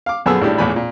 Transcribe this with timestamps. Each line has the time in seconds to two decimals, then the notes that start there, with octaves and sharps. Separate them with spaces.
0.06 F5 D6
0.26 A#1 F#2 B3 G#4 A4 E6
0.41 G#1 A2 G3 D4 G4
0.58 A#1 E2 A2 E3 G#5 B5
0.76 A#2